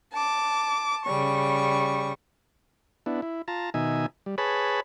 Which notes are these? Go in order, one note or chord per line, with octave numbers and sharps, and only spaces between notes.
A5 D6
C#3 G3 C#6
B3 D4 E4
E4
F4 A5 A#5
B2 D#3 D#4 E5 G#5
G3
G#4 B4 C#5 A5 B5